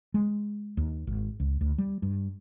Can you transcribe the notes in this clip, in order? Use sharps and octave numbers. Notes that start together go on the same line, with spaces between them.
G#3
D#2
G#1
C#2
D2
G3
G2